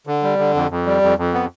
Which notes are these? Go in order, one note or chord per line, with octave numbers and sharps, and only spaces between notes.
D3
G3
D3
F2
F2
G3
F2
F2
B3